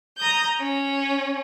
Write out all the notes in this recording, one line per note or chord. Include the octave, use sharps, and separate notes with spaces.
A#5 D#6 G6
C#4